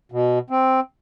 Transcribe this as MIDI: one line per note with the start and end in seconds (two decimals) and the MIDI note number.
0.12 0.39 47
0.50 0.80 60